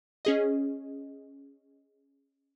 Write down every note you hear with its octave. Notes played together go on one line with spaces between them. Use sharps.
C#4 G#4 D#5